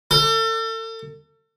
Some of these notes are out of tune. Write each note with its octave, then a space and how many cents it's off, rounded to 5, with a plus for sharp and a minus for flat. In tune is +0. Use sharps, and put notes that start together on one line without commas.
A4 +35